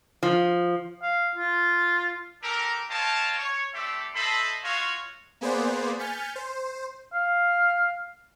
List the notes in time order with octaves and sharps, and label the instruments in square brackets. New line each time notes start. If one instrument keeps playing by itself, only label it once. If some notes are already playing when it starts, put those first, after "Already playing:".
[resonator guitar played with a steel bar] F3
[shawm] F5
F4
[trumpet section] D4 G4 A4 A#4
C5 C#5 D#5 F5 G5 A5
C#5
A3 C4 G4 A4 D5 E5
A4 C5 D#5 E5 A5 B5
F4 F#4 C#5 D#5 F5
[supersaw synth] A#3 B3 G#4 B4 C5 D5
G#5 F6 G6 A6 B6 C#7
C5
[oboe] F5